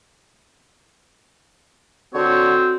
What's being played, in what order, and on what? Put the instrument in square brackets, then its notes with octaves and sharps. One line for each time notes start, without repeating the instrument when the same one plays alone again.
[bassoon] D3 [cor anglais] C4 [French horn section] F#4 [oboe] C#5